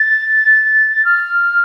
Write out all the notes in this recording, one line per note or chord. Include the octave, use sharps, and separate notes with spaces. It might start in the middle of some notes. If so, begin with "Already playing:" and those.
Already playing: A6
F6